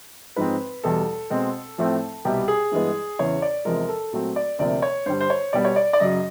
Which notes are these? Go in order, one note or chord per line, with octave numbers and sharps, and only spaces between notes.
G#2 F3 G#3 C4 B4
E2 B2 G3 A4
B2 G#3 C4
A2 F3 A3 C4
C2 B2 G3 G4
G#4
G2 E3 G#3 B3
E2 C#3 E3 C#5
D5
E2 C3 F3 G#3 A#4
A4
A#2 F#3 A3 C4
D5
D2 C3 F3 A#3 D5
C#5
G2 D3 G3 C5
C5
C#5
B2 G3 B3 D5
C#5
D5
D5
F#2 C#3 F#3 D#5